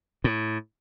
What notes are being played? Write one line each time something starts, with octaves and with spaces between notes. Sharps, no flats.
A2